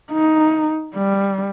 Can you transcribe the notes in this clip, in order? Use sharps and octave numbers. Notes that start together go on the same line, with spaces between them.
D#4
G3